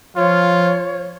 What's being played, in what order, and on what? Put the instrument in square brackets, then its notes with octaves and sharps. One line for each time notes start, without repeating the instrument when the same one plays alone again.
[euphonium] F3 [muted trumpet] F4 [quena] C#5